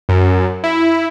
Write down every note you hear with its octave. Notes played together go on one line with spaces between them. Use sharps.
F#2
E4